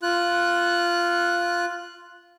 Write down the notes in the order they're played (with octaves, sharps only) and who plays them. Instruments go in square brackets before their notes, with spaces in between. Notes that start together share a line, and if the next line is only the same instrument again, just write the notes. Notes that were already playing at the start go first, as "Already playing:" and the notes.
[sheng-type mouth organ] F4 F#6